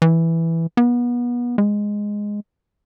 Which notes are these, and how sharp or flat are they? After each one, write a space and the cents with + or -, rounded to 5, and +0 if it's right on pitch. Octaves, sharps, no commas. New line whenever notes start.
E3 +0
B3 -30
G#3 -5